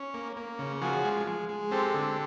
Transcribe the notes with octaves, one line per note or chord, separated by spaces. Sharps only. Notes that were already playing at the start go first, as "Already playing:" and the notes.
Already playing: C#4
A#3
A#3
C#3
F3 F#4 G#4
G#3
G#3
G#3
C4 G4 A4
D3